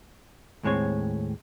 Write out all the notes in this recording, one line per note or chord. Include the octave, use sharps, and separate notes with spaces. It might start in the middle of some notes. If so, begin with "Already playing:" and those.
D#2 A2 G#3 C4 C#5